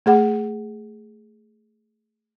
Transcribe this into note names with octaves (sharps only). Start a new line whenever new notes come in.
A3 G#4 F#5